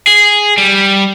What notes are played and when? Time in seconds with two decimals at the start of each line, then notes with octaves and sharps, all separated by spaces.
0.07 G#4
0.58 G3